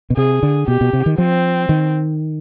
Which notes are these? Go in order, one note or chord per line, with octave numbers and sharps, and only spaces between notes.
B2
C3 G#4
D3
B2 G4
B2
C3
D#3
F3 C4
D#3